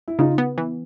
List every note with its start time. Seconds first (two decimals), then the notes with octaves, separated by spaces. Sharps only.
0.08 E4
0.19 C#3 D#4 F4
0.38 B3
0.58 E3